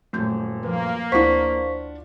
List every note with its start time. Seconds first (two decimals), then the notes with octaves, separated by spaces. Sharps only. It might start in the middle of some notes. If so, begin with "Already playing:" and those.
0.13 D#1 F#2 A3 G6
0.63 F3 A#3 B4
1.12 D2 D4 E4 F4 C5 F#5 C#6 B6